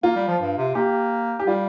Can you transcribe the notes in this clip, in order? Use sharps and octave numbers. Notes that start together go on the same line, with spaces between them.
A#3 F4
G3
F3
G2
C3
A#3 G4
G4
G3 F4